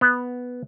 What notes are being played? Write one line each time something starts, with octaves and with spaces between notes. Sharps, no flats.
B3